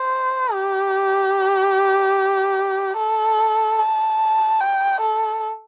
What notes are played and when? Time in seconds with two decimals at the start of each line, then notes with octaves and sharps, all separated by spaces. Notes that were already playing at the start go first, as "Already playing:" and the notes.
Already playing: C5
0.52 G4
2.96 A4
3.79 A5
4.61 G5
5.01 A4